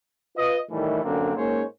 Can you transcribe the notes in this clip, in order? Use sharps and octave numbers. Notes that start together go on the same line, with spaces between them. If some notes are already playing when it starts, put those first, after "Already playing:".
F4 B4 D#5
A2 D#3 E3 G3 A3
F#2 D3 A#3 C4 D4
G#2 A#3 C#4 C5 C#5